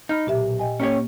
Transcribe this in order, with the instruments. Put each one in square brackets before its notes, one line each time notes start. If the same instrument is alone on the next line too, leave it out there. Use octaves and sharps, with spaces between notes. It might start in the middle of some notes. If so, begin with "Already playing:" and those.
[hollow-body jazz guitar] D#4 [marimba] B5 F6 G6
[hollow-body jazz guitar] B1 [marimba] A#2 G4 E5
[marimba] D#5 G5 G#5
[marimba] A#3 [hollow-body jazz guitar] C#4 G4 C#5